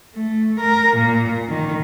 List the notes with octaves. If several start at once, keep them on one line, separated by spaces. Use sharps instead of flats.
A3
A#4
A#2
D#3